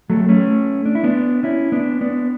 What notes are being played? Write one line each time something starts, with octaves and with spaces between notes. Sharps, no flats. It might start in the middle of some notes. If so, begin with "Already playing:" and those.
F#3 A3
A3 C#4
D4
E4
B3 D4
C#4 E4
B3 D4
B3 D4